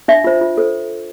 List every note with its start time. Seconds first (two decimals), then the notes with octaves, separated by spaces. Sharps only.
0.08 D4 E5
0.24 F4 C5
0.41 F4
0.57 A4 C5